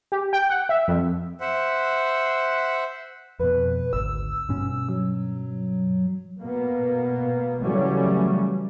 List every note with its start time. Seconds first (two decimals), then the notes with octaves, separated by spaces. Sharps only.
0.12 G4
0.33 G5
0.50 F#5
0.69 E5
0.88 F2
1.41 C5 E5 F#5
3.39 F2 B2 B4
3.93 G#1 D2 E6
4.49 G2 B2 C#4
4.89 F#3
6.40 B2 A#3 B3
7.61 C#3 E3 F#3 G3 A3 C#4